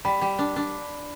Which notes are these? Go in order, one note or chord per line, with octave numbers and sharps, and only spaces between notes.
G3 B5
G3
D4
D4